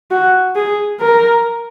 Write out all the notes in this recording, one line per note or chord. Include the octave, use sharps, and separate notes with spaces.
F#4
G#4
A#4